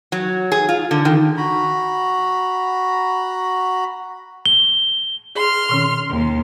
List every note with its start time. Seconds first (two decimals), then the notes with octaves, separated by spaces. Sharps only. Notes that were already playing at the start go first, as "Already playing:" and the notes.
0.12 F#3
0.52 G#4
0.69 F4
0.91 D3
1.05 D#3
1.37 F#4 A#5 B5
4.46 G7
5.35 G#4 C6 F6
5.69 B2 D#3 C#4
6.10 D#2